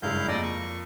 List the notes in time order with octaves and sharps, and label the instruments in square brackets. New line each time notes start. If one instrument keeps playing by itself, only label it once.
[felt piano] F#1 G2 G#3 [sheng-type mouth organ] E4 F5 G6
[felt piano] F2 A#3 [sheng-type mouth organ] D5 D#5
[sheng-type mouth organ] C#6